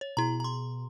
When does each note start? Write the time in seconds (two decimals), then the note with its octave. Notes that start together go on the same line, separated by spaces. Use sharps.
0.01 C#5
0.17 B2 E4 G#4 A#5
0.40 A#5 C6